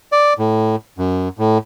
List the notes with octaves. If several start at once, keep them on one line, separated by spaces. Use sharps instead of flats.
D5
A2
F#2
A2